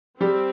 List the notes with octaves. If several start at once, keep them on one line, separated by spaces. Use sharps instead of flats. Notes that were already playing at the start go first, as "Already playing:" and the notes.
G3 C4 G4